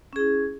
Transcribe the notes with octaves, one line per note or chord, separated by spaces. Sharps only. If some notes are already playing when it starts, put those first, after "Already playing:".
C#4 E4 G#4